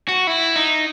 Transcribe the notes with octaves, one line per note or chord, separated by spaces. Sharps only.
F#4
E4
D#4